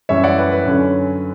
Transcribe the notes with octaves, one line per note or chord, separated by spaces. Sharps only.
F#2 E3 G3 C#5 E5
D5 F#5
B4
B4
F#2 D3 F#3 C#4